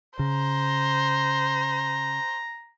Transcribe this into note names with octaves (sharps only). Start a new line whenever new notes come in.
C#3 C5 A#5